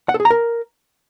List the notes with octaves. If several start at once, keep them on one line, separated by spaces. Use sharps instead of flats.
F#5
A4
G#4
A#5
A#4